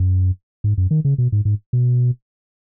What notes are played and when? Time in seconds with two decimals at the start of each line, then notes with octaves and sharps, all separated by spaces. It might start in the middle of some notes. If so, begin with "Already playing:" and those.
Already playing: F#2
0.64 G#2
0.78 F#2
0.91 D#3
1.05 C#3
1.18 B2
1.32 G#2
1.45 G#2
1.73 B2